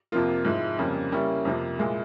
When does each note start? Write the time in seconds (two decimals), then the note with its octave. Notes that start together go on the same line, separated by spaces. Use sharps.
0.12 F2 C3 F3 A#3 F4
0.45 G#2 F3 G#3 E4
0.79 F2 C#3 G3 A#3
1.12 C#3 G3 A#3 C#4 E4
1.45 F2 C3 F3 A#3
1.79 A#2 G#3 E4